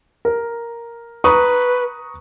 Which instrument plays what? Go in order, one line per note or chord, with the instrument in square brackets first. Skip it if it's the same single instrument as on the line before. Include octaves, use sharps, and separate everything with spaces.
[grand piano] A#4
[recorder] B4 [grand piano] A#5 C#6 D#6